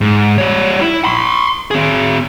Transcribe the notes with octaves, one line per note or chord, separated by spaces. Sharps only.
G#2
G3 C#5
E4
B5 C6
C4 G#4